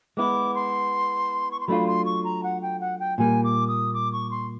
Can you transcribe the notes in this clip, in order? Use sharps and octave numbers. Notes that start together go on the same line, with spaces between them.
G#3 B3 E4 D6
C6
C#6
C6
F#3 A3 D4 F4 B5
C6
C#6
A#5
F#5
G5
F#5
G5
A#2 G3 A#3 G#5
D6
D#6
D6
C#6
C6